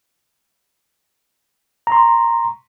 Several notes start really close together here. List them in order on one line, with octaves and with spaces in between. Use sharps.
A#5 C6 C#6